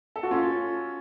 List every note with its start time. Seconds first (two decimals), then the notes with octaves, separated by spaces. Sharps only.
0.16 A4
0.23 F#4
0.31 C#4 F4